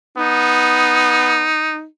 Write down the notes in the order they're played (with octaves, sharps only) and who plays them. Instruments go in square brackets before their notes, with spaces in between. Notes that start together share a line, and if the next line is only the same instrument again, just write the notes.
[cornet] B3 [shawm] D#4